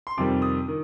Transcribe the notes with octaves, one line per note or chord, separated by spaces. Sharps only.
C6
F2 C3 D#3 G3 D6
D#6
D#3